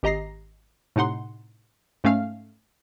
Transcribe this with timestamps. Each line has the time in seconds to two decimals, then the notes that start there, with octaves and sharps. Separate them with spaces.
0.03 G#1 G4 D#5 A#5 A#6 C7
0.96 A2 C3 D#4 F#5 C6
2.04 G#2 A3 C#4 F5 F6